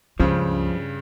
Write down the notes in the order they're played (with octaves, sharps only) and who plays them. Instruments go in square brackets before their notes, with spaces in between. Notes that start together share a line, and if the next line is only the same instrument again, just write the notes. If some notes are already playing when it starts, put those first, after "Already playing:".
[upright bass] C#2 C#4 [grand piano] G2 C#3 [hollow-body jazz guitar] F3